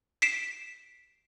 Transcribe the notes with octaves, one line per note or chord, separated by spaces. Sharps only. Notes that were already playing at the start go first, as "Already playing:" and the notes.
B6 C7 D7 E7